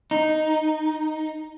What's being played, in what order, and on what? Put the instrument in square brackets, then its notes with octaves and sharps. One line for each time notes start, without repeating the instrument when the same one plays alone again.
[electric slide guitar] D#4